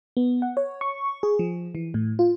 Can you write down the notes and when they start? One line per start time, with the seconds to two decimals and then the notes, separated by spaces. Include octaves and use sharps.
0.17 B3
0.42 F#5
0.57 C#5
0.81 C#6
1.23 G#4
1.39 F3
1.75 E3
1.94 A2
2.19 F4